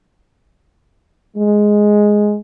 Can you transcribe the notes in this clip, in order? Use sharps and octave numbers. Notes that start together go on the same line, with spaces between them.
G#3